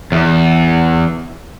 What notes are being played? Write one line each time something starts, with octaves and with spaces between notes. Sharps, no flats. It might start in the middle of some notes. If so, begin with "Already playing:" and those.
E2